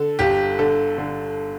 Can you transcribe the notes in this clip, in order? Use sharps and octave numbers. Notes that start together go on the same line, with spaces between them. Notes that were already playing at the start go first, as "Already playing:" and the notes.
Already playing: D3 A4
G1 G4
D3 A4
D3